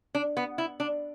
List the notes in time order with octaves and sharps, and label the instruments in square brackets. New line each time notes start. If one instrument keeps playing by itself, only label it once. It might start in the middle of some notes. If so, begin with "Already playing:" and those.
[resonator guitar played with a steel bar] D4
B3
E4
D4